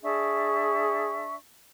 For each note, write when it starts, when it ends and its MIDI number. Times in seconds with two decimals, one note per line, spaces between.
0.03 1.35 62
0.03 1.25 68
0.03 1.35 76
0.03 1.35 85